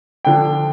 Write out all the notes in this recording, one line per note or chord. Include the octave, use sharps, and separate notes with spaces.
D3 F3 D4 G5